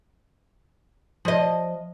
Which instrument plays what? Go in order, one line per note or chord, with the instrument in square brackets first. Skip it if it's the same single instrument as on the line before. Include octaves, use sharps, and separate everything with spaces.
[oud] F3 D#5